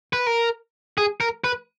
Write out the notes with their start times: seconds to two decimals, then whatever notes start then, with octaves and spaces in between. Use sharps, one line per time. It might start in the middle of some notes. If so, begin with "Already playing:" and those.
0.13 B4
0.27 A#4
0.98 G#4
1.20 A#4
1.44 B4